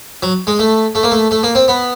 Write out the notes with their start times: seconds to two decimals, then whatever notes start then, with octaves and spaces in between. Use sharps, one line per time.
0.23 F#3
0.47 G#3
0.59 A3
0.95 A3
1.03 A#3
1.11 A3
1.31 A3
1.43 A#3
1.55 C4
1.68 B3